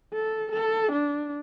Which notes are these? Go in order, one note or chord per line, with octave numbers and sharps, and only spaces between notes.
A4
A4
D4